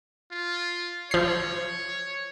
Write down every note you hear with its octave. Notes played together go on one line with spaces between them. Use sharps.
F4
F3 C#5 C7